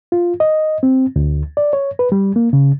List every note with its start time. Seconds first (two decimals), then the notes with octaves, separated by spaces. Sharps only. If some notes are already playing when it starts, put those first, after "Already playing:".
0.12 F4
0.40 D#5
0.83 C4
1.16 D2
1.57 D5
1.73 C#5
1.99 B4
2.12 G3
2.36 A#3
2.53 C#3